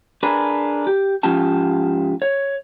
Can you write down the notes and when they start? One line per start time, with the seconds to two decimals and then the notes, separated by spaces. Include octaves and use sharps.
0.23 D4 G#4 A#4 B4
0.87 G4
1.23 G#2 F3 C#4 F4 G4 A5
2.22 C#5